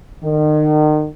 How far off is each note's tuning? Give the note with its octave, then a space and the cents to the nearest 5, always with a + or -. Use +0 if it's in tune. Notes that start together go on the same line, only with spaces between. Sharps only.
D#3 -35